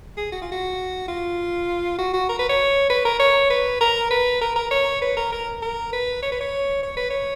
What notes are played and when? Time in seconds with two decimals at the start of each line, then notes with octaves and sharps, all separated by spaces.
0.17 G#4
0.32 F#4
0.42 F4
0.52 F#4
1.08 F4
1.99 F#4
2.14 F#4
2.29 A#4
2.39 B4
2.49 C#5
2.90 B4
3.05 A#4
3.20 C#5
3.50 B4
3.81 A#4
4.10 B4
4.41 A#4
4.56 A#4
4.71 C#5
5.02 B4
5.17 A#4
5.32 A#4
5.62 A#4
5.93 B4
6.22 C#5
6.32 B4
6.41 C#5
6.83 C#5
6.97 B4
7.10 C#5